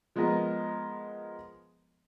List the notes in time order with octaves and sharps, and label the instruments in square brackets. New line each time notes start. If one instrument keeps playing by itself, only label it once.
[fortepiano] F3 G#3 B3 A#4 D#5